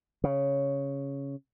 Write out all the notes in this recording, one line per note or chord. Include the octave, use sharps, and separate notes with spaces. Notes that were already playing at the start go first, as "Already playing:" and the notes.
C#3